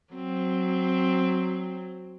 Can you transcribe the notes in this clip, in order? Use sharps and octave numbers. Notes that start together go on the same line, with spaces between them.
F#3 C4